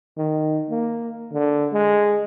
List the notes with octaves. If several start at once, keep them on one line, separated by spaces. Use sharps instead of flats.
D#3
A#3
D3
G#3